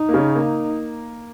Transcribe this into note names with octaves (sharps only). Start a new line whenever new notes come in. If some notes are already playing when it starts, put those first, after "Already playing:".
Already playing: D#4
A#3
C#3 C#4
A#3